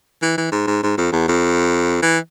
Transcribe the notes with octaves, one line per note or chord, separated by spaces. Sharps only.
E3
E3
G#2
G#2
G#2
F2
E2
F2
E3